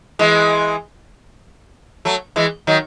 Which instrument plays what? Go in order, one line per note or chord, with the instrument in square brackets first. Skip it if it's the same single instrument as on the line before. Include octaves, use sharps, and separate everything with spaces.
[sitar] E3 G#3
F#3 A3
E3 G#3
D#3 F#3